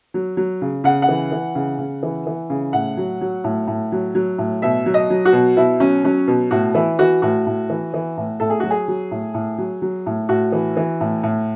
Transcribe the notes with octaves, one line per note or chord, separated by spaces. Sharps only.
F#3
F#3
C#3
C#3 F#5
F#5
E3
E3
C#3
C#3
E3
E3
C#3
A2 F#5
F#3
F#3
A2
A2
F#3
F#3
A2
B2 E5
F#3
D#5
F#3
F#4
B2
B2 E4
F#3 C#4
F#3 C#4
B2
A2 F#4
E3 E4
E3 F#4
A2 F#4
A2
E3
E3
A2
A2 A4
G#4
F#3 F#4
G#4
F#3
A2
A2
F#3
F#3
A2
A2 F#4
E3
E3
A2
A2